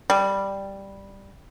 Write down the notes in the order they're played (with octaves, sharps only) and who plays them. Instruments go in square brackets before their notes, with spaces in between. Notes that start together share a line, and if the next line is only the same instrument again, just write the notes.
[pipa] G3